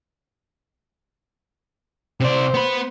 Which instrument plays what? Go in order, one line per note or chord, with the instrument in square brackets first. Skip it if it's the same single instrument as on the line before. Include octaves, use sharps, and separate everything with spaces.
[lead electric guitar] C3 D5 [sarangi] C5
[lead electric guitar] B3 B5